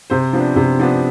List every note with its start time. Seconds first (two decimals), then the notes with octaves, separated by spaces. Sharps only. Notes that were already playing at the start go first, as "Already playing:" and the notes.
0.10 C3 C5
0.33 F3 B3 D4
0.56 C3
0.79 F3 B3 D4